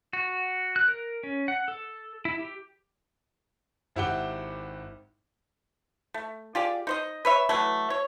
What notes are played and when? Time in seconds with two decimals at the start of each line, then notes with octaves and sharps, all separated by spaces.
0.13 F#4
0.76 F#6
0.88 A#4
1.23 C#4
1.48 F#5
1.68 A4
2.25 E4
2.39 G4
3.96 G#1 E4 G4 F#5 D6 G7
6.14 A3
6.55 F4 G4 G#4 D5
6.87 D#4 C5 D#5
7.25 B4 C#5 E5
7.49 E3 F#3 A3
7.90 C#5